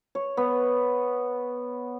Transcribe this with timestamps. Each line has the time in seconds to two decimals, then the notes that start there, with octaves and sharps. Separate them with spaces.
0.15 C#5
0.37 B3